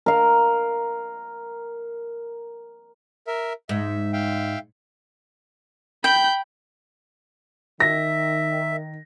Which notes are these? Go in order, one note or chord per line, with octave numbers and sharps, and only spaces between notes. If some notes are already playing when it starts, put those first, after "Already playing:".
A#4 F5
A#4 E5
G#2 E5
E5 F5 G5
G5 B5 G6
D#3 E5 A#6